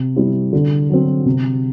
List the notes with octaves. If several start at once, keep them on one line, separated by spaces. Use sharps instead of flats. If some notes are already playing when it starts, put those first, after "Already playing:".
Already playing: C3
G3 C4 E4 G4
D3
F#3 C4
C3